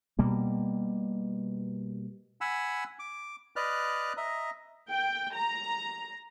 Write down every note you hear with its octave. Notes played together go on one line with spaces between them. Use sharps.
B2 G3 A#3
F#5 G#5 B5 E6
D6
B4 D5 D#5 F6 F#6
D#5 E5 A#5
G5
A#5